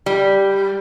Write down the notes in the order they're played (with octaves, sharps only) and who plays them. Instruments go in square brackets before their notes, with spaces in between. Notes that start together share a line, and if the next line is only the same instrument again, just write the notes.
[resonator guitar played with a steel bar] G3